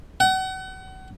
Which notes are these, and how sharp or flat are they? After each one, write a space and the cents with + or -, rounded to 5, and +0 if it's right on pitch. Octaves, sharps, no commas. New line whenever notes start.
F#5 +35